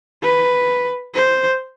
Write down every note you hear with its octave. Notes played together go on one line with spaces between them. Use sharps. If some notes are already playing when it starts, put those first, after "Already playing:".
B4
C5